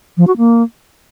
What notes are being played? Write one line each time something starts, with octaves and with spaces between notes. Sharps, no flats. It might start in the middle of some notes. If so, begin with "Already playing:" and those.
F3
F#4
A#3